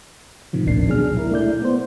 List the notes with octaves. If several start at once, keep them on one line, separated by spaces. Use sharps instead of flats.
A2 C3 D#3 F3
A1 D2 A#2 A#3 D4 C7
B2 F#3 D4 G#4 F6
E4 A#4
A3 E4 D5 G6
B3 C5